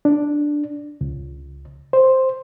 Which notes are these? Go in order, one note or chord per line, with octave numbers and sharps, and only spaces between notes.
D4
C#2
C5